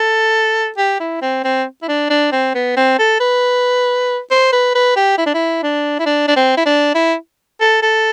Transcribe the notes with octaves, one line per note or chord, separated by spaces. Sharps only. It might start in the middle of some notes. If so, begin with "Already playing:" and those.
Already playing: A4
G4
E4
C4
C4
E4
D4
D4
C4
B3
C4
A4
B4
C5
B4
B4
G4
E4
D4
E4
D4
E4
D4
D4
C4
E4
D4
E4
A4
A4